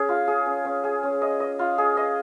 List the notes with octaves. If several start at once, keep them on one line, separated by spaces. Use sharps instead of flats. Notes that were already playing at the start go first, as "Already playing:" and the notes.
Already playing: C#4 G#4
F4
G#4
C#4
C#4
G#4
C#4
D#5
D#5
F4
G#4
D#5